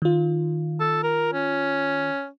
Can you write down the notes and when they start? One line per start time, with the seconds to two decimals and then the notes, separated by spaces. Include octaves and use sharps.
0.02 D#3 F4
0.80 A4
1.03 A#4
1.33 C#4